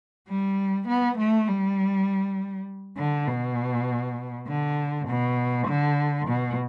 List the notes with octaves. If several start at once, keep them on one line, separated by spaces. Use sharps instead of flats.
G3
B3
A3
G3
D3
B2
D3
B2
D3
B2